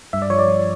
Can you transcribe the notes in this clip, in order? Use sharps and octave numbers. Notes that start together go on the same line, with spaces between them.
G2 E5
D5
F3 C#5
D5
F3